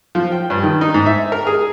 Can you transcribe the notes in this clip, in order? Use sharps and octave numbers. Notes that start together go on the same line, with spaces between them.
F3
G5
G2
D#3
D#4
G#2
E5
A#4
G#4